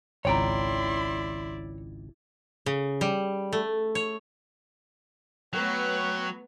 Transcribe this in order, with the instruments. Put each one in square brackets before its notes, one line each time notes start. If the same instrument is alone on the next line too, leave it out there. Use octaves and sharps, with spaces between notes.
[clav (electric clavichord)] G#1 C#2 [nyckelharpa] E4 D5 [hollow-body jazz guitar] C#5 G5 A#5 [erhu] C6
[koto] C#3
G3
A3
C#5
[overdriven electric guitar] F#3 [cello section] A3 B3 B4 [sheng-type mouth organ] C#5 F#5 G5 [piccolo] F#6